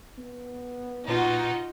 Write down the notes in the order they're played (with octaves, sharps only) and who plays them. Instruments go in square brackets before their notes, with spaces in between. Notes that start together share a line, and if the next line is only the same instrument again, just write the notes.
[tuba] B3
[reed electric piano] A#2 B4 [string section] D#4 F#4 [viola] F4